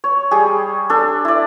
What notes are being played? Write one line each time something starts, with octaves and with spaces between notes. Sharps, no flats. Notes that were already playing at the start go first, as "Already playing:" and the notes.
C#5
G3 G#4
D4 A4
E4 D5